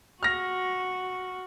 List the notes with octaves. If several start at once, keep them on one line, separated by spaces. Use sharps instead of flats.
F#4 F6 A#6